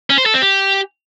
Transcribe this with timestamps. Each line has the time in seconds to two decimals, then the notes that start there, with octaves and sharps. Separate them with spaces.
0.10 C#4
0.18 C5
0.26 A4
0.34 C4
0.42 G4